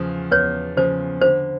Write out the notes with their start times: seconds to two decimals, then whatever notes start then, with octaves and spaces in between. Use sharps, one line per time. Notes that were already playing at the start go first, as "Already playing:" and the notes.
Already playing: E2 C#3 F3
0.31 E2 B4 C#5
0.77 C#3 F3 C5
1.22 D3 C5